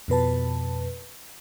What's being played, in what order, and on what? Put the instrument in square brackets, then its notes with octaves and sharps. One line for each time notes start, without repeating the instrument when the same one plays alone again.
[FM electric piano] F2 B2 B4 A5